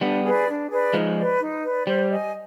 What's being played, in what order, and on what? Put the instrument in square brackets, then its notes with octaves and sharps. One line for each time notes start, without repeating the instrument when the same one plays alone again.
[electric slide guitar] G3 B3 [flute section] D4
[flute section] G#4 B4 D5
D4
G#4 B4 D5
[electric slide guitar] F3 G#3 [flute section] D#4
[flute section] B4 D5
D#4
B4 D5
[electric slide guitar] G3 [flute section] C5
[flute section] D#5 G#5